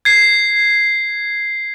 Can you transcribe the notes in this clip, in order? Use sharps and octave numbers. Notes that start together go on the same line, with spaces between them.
G#6 C7